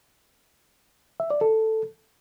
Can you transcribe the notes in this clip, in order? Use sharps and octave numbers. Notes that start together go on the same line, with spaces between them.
E5
D5
A4